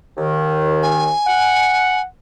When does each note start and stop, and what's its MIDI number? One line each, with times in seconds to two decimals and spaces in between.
0.17 1.11 39
0.17 1.11 51
0.83 2.01 80
1.27 2.03 78